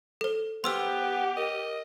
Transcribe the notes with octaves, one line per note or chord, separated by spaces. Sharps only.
A4 C5
B3 G4 C5 C6 E6 F6
F#5
A#4 D#5